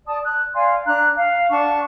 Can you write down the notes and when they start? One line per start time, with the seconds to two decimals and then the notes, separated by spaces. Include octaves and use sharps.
0.06 D5 A5 D#6
0.24 F#6
0.53 D5 F5 G#5 C6
0.85 D4 A#5 F#6
1.16 F5
1.50 D4 F#5 A5 C#6